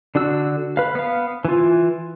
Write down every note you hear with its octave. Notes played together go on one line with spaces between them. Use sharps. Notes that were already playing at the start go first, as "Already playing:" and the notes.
D3 D4 F#4 E6
B4 F5
B3 F5
E3 F4